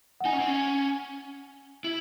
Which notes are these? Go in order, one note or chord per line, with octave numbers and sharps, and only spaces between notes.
F#5
D#4 G#5
C#4
C4
C#4
E4